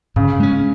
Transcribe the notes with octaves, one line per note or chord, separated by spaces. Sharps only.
G#2 C#3
G#3 C#4